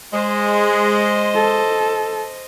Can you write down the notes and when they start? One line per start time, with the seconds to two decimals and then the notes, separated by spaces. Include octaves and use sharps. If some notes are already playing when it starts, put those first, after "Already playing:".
0.13 G#3 C5 D#5
1.35 A4